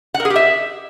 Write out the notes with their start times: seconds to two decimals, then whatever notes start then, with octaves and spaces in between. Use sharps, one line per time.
0.14 F#5
0.20 A#4
0.25 G#4
0.30 G4
0.36 E5